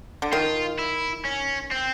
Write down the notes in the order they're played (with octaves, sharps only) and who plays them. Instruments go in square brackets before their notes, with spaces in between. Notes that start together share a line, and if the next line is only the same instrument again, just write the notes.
[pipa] D3
[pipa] D#3 [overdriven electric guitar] F4
[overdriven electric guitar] E4
C#4
C4